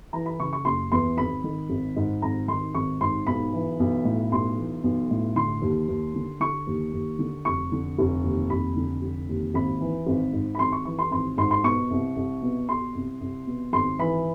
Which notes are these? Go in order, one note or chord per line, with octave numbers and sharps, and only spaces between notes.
E3 A#5
B5
C#3 C#6
C#6
F#1 C6
E2 C6
G#1 B5
D#3
G#1
G#2
G#1 A#5
D#3 C6
G#1 C#6
G#2 C6
B1 B5
E3
B1
A2
B1 C6
E3
B1
A2
D3 C6
D#2
D#2
D3
D3 C#6
D#2
D#2
D3
F1 C#6
D3
F1
D#2
F1 B5
D3
F1
D#2
G#1 B5
E3
G#1
G#2
B5
G#1 C6
C#6
E3 C#6
C6
G#1 C6
G#2 C6
C6
B2 C#6
C2
C2
B2
B2 C6
C2
C2
B2
G#1 C6
E3 B5